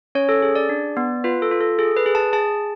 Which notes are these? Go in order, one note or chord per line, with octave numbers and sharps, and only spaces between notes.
C#4 C#5
A4
G#4
D5
D4
B3
F4 B4
A4
F4
A4
G#4 A4
B4
G#4
A5
G#4 A5